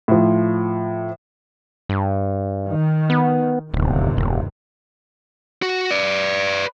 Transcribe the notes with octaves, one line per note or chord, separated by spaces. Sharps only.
A2 F3
G2
D#3
B3
D1 G1 D#2 C3
E1
F#4
B4 D5